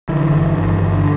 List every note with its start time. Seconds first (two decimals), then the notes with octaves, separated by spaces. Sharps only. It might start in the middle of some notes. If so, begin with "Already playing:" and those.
0.09 D3 E3
0.26 G1
0.43 G2
0.59 G1
0.77 G1
0.94 D3